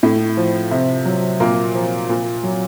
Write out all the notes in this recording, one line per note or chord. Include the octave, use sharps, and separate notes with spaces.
A2
F3
C3
F#3
A#2 A#3
F3
A#2
F#3